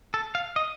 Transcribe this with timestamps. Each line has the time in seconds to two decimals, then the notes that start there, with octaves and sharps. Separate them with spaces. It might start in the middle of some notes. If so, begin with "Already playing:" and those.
0.14 A4
0.35 F5
0.56 D#5